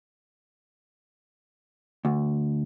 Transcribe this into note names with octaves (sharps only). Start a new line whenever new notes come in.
D2